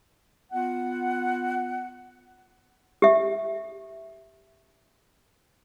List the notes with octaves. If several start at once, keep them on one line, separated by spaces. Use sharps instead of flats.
B3 F4 F#5
G4 E5